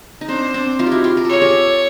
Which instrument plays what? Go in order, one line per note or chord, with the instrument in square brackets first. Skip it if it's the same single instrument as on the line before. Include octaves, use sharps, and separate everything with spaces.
[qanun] D#4
[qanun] C4 D4 [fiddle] C5
[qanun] C4 D4
D#4 F4
G4
E4 F#4
F4 G4
A#4
A4
[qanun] G#4 [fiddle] C#5
[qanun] G4 A4